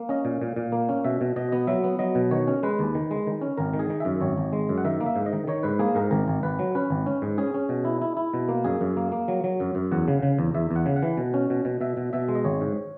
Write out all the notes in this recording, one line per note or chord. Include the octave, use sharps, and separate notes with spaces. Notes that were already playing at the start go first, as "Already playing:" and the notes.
Already playing: A#3
C#4 D#5
A#2
A#2
A#2
A#3
C#4
B2 E5
B2
B2 D#5
B3 D#5
F#3 E5
B3
F#3 D#5
B2
D#3 C#5
C#4
G#3 B4
D#2
D#3
G#3
D#3
C#4
G#1 A#4
D#3
G#4
D#3
F#2 E5
G#1 C#5
G#1
G#3
F#2
F#5
D#3 E5
A#3
E5
G#2
D#5
D#3
D#3 C#5
G#2 B4
A#3 G#4
G#2 A#4
G#1 A#4
G#1
G#1 B4
F#3
C#4 B4
G#1
C#4
G#2
C#4 G#4
C#4
B2
E4
E4
E4
B2
A#3
F#2 G#4
F#2
A#3
A#3
F#3
F#3
F#2
F#2
E2 F#5
C#3
C#3
E2
E2 E5
E2
F#5
C#3
F#5
E3
B2
C#4
B2
B2
B2 E5
B2
B2 E5
G#3
D#5
G#1 C#5
G#2